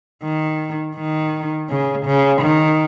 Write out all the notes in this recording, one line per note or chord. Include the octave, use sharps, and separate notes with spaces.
D#3
D#3
C#3
C#3
D#3